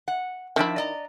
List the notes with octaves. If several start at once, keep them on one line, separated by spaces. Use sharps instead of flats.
F#5
D#3 F3 D4 E4 E5
D5 D#5 A#5